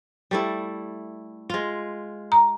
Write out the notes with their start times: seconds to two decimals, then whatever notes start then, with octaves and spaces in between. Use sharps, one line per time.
0.31 G3 A3 E4
1.50 G#3 F4
2.32 A#5